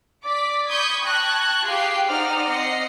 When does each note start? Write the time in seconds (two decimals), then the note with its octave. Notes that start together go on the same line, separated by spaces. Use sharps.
0.23 D5 D6 B6
0.69 B5 C#6 D#6 G6 G#6 B6
1.03 G5 A5 C#6 F#6 G#6 A#6
1.64 F4 G4 G#4 F5 G5 C7
2.07 D#4 C5 D5 F#5 F6
2.50 C4 D#5 F#5 A#6 C7 C#7